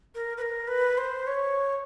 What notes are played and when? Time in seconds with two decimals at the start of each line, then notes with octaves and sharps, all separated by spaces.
0.15 A#4
0.37 B4
0.42 A#4
0.68 B4
0.98 C5
1.27 C#5